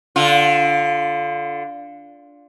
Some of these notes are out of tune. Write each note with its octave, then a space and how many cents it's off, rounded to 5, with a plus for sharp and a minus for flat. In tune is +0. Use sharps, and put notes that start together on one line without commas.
D3 -15 F4 +0